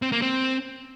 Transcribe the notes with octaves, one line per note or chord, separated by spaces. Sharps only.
C4
A#3
C4